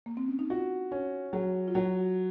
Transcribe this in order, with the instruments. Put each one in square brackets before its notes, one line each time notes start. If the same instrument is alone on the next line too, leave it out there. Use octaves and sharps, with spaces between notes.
[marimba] A#3
C4
C#4
D#4
[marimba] F4 [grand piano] F#4
[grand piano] C#4
[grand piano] F#3 [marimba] G#4
[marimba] F4
[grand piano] F#3 [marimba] F#4